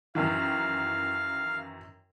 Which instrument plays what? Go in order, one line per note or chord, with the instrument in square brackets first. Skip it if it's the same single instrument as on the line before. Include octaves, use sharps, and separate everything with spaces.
[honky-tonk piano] F#2 D#3 E3 [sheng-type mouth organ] F5